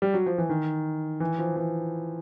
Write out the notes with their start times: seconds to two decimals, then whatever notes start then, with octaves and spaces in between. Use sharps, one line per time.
0.02 G3
0.14 F#3
0.26 F3
0.38 E3
0.49 D#3
1.20 E3
1.38 F3
1.56 E3